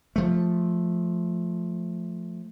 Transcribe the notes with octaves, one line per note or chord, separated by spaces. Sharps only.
F3 A3